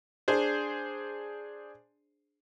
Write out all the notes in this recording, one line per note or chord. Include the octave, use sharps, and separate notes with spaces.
D4 G#4 C5